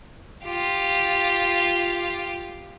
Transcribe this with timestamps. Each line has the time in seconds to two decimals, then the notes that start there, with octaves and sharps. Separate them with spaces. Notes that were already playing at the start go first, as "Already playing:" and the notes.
0.46 F4 G4